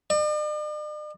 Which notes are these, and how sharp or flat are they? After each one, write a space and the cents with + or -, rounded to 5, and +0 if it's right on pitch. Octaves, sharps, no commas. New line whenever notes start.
D5 +45